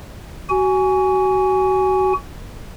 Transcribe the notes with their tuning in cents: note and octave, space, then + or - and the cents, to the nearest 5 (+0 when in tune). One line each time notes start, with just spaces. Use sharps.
F#4 +30 G#5 +0